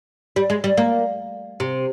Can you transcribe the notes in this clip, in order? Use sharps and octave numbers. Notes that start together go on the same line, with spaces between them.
G3
G#3
G3
A#3
C3